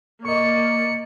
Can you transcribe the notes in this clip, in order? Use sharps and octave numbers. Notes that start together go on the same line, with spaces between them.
A#3 D5 D#5 C#6 C#7